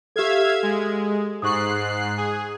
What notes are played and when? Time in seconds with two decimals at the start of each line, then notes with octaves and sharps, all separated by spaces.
0.16 G4 A4 E5 F5 G#6
0.63 G#3
1.42 G#2 C#6 D#6 F#6 C7
2.17 G#4